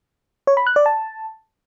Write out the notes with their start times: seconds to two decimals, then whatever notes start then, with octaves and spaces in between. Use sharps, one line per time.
0.47 C#5
0.57 B5
0.67 F#6
0.76 D5
0.86 A5